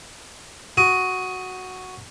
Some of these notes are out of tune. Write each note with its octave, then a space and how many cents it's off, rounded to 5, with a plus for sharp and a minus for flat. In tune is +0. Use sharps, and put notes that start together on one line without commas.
F#4 +0 D#6 +15